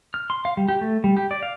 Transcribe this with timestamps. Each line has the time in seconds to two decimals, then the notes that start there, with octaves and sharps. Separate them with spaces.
0.14 F6
0.30 C6
0.45 F5
0.57 G3
0.68 G4
0.81 A3
1.04 G3
1.17 G4
1.31 D5
1.43 F5